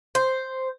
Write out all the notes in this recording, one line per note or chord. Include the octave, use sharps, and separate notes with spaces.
C5